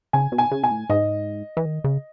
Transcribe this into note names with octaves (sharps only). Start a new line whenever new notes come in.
C#3 G#5
B2
G#5
C#3
B2 G#5
A2
G#2 D#5
E3
D#3
C#3